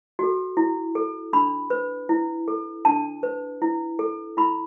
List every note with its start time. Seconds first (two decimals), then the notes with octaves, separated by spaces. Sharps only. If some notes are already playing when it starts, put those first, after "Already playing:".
0.19 F#4 A4
0.57 E4
0.95 A4
1.33 D4 B5
1.70 B4
2.09 E4
2.48 A4
2.85 D4 A5
3.23 B4
3.62 E4
3.99 A4
4.37 E4 B5